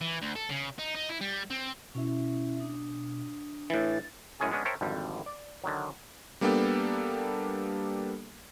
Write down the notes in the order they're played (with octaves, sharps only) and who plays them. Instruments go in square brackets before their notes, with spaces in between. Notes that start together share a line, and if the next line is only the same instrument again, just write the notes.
[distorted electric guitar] E3
D2
A4
C#3
D#4
D#4
E4
G3
C4
[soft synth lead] B2 [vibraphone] C#4 E4 E5
[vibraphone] D4 D#6
[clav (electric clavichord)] A2 E3 [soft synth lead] A6
[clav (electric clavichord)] F#2 A2 G#3 C#4 G#4 A5
G#3 B3 C#4 D4
A#4 C5 C#5 E5 G5 A5
G#1 F2 D3 G3
D5
D3 D#3 F#3
[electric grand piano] G3 A#3 B3 D4 G4 A4